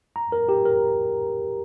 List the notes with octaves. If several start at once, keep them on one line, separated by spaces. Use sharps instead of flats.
A#5
A#4
G4
A#4